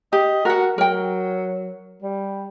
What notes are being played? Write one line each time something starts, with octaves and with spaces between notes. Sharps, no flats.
G4 D#5
F#4 A#4 F#5
F#3 A#4 G5
G3